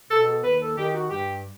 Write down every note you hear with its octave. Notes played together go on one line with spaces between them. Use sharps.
B2 A4
A4
D#2 B4
A4
D#3 G4
F#4
G2 G4